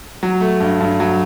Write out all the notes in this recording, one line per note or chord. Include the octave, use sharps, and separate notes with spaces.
F#3
A3
G2
G2
F#3